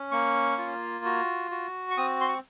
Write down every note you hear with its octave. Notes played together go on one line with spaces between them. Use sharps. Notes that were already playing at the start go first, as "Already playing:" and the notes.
Already playing: C#4
A#3 C#6
F4
F#4
F#4
C#6
C4 D#6
C6
C#6